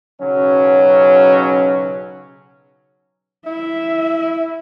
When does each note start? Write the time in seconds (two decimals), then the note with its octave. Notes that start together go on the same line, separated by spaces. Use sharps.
0.20 B1 C#3 F#3 C#4
3.46 E4 E5